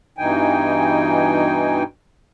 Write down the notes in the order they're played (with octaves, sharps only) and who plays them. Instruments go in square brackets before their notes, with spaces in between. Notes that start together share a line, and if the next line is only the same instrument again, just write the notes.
[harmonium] G2 B2 E3 D#4 G5 G#5